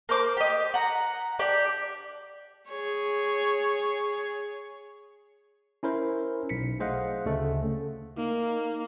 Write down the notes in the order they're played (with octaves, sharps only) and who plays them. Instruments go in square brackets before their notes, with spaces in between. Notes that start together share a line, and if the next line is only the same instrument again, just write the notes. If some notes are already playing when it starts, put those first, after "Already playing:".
[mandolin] A#3 C5 D6
G4 D#5
F#5 A#5
D4 G4 D5
[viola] G#4 C#5
[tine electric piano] C#4 E4 A#4 C5
B1 B6 C#7
A3 G#4 C5 D#5 F5 F#5
D2 C#3 A3 C#4 A4
[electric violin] A#3 [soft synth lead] D#4